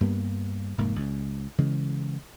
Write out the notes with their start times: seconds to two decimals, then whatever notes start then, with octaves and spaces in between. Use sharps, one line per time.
0.01 G2 G3 A#3 B3
0.78 F1 G#2 A#3
0.96 C#2
1.58 C#3 E3 G#3